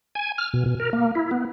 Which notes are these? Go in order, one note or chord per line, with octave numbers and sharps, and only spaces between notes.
G#5
F6
B2
B2
A#4
A#3
E4
B3